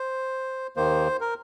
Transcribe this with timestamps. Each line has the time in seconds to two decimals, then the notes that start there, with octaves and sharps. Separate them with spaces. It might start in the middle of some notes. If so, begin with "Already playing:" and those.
Already playing: C5
0.76 D#2 D#3 A#3 C5
1.21 A#4